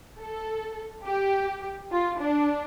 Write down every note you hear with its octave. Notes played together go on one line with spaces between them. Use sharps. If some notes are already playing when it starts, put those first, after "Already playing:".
A4
G4
F4
D4